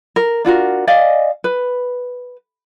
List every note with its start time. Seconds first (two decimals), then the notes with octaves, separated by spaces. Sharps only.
0.16 A#4
0.45 D4 F4 F#4 A#4
0.87 D5 D#5 F5 G#5
1.44 B4